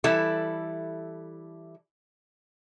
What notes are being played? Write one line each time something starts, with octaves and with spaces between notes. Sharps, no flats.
E3 G3 E4 A4